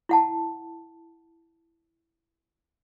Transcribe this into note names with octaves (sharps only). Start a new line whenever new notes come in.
E4 F#5 A5